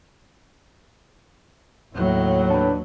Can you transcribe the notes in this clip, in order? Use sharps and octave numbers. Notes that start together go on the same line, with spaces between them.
D#2 A2 F#3
D4 B4